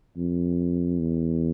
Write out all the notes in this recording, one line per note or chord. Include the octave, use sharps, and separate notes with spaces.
F2
E2